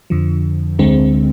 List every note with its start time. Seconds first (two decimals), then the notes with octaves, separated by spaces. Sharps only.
0.10 F2 D3 F3
0.79 D2 D3 G#3 C4